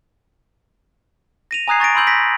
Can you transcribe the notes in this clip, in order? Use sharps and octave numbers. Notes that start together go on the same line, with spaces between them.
A#6 D#7 F7
G#5 A#5 D#6 F#6 G#6 C7
C#6 A6 A#6 D7
B5 C6 E6 G6 F#7
G6 A#6 B6 D7